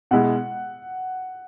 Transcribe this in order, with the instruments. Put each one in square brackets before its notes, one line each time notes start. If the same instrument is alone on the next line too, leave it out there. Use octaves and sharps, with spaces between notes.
[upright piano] B2 G#3 E4 G#4 [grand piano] F#5